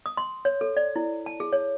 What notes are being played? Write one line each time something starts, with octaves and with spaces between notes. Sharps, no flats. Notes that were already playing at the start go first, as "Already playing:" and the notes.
D#6
C6
C#5
A4
D5
E4
A5
G#4
C#5